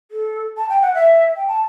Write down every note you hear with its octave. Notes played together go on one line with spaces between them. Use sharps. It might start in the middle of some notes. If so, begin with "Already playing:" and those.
A4
A5
G5
F#5
E5
G5
A5